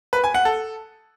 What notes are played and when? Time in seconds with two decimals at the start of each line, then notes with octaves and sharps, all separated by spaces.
0.13 B4
0.24 G#5
0.34 F#5
0.45 A4